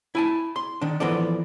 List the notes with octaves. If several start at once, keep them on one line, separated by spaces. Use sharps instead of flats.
E4 G#5 A5
C6
D#3 D4
E3 F3 B3 A4 D5